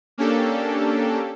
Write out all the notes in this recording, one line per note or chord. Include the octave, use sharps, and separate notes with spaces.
A#3 C#4 D4 G4 A4